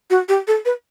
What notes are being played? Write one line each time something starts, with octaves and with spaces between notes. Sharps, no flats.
F#4
G4
A4
B4